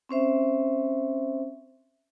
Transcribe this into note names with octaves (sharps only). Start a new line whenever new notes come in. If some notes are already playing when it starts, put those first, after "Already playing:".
C4 C#4 C5 E5